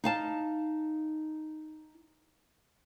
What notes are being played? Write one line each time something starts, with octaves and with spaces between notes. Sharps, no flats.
D#4 F5 A5